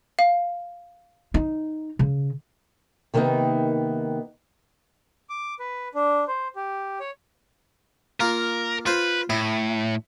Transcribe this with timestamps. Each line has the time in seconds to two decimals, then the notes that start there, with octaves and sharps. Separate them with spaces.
0.19 F5
1.34 D#4
1.99 C#3
3.14 C3 D#3 A#3 B3 D#4
5.29 D6
5.59 B4
5.94 D4
6.28 C5
6.56 G4
7.00 C#5
8.20 A#3 F4 A#4
8.86 F4 B4 C5
9.30 A2 E4